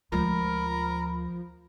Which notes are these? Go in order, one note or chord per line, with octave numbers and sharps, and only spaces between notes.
D2 F3 G#3 A#4 B5